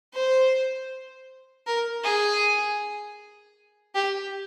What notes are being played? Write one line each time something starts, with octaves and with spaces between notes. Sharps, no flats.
C5
A#4
G#4
G4